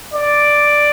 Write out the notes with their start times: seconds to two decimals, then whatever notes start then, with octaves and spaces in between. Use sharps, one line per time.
0.14 D5